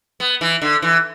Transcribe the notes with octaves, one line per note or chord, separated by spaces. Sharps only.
B3
E3
D3
E3